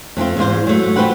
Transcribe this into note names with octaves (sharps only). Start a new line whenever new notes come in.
F2 A3 C4 F4
E2 G#2 F4 C5
F#3 A3
A3 F4 G4 B4 C5 F#5